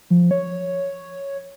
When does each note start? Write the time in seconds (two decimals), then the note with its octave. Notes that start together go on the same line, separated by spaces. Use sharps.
0.10 F3
0.31 C#5